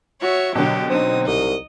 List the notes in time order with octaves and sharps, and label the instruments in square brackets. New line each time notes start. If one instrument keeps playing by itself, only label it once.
[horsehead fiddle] F#4 [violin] C#5 E5
[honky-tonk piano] B2 D3 [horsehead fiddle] F#3 [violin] G4 A#4
[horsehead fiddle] F#3 D#4 [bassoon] C4 [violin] D#6
[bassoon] C2 [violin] D#5